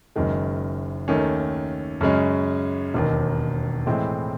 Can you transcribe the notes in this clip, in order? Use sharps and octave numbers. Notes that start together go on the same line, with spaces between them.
F#1 F#2 D#3 G#3
D#2 D#3 A3 C#4
F#2 C#3 G#3 C#4
E1 D#2 D#3
A2 E3 G#3 C4 E4